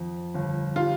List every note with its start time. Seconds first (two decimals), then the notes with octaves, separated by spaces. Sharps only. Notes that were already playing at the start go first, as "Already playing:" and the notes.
Already playing: F2
0.34 G1
0.76 G3 F4